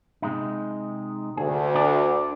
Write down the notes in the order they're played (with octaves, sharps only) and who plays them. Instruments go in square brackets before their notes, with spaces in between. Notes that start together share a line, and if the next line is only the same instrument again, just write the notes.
[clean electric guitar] C3 G#3 D#4
[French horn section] D2 [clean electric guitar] G#4
[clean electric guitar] D4 A4 D5